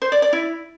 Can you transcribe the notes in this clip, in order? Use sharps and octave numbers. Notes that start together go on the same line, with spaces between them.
C5
D5
D5
E4